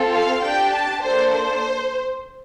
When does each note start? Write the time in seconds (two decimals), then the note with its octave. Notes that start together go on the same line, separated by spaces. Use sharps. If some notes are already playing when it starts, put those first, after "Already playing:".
Already playing: C4 F4 A4
0.12 F5
0.43 D4 G4 G5
0.72 A5
1.03 A#3 D4 A4 C5
1.33 C5